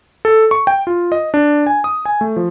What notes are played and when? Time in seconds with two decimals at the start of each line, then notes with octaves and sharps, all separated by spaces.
0.25 A4
0.51 C#6
0.67 G5
0.87 F4
1.12 D#5
1.34 D4
1.66 G#5
1.84 D#6
2.05 G#5
2.21 A3
2.36 F3